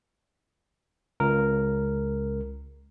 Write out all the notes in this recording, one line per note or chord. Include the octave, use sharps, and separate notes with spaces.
C#2 A#4